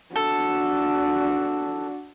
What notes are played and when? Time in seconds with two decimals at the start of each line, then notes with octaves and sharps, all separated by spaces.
0.16 D4 F#4 A4